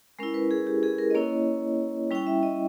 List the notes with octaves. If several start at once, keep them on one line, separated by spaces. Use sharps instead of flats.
G#3 C#4 E4 A#4
B4
G#4
G4
G#4
A#4
D#5
A#3 C#4 E4 C#5
G3 C#4 E4 G5
E5
D#5